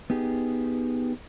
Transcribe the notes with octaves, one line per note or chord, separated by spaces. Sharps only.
B3 D#4 G4 G#4